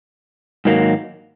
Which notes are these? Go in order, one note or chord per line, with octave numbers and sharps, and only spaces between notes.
G#2 D#3 F#3 A#3